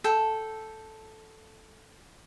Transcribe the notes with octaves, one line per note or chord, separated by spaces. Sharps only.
A4 G5